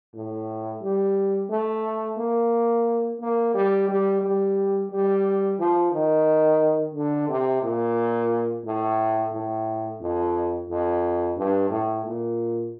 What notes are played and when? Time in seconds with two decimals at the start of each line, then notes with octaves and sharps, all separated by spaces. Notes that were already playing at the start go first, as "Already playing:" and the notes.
0.14 A2
0.82 G3
1.50 A3
2.17 A#3
3.21 A#3
3.54 G3
3.88 G3
4.22 G3
4.91 G3
5.59 F3
5.92 D#3
6.94 D3
7.29 C3
7.62 A#2
8.65 A2
9.32 A2
10.00 F2
10.69 F2
11.37 G2
11.70 A2
12.05 A#2